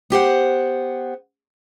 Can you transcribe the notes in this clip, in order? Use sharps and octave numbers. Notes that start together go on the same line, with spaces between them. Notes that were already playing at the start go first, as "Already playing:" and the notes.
B3 G4 C5 F#5